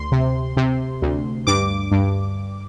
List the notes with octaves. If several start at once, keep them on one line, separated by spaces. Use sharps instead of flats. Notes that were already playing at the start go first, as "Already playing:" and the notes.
Already playing: D2 C6
C3
C3
D2
G2 D6
G2